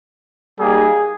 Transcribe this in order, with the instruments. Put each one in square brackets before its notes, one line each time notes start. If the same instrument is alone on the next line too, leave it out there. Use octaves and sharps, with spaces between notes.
[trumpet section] G3 A#3 D#4 G#4